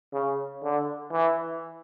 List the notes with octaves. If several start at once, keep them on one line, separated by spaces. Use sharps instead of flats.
C#3
D3
E3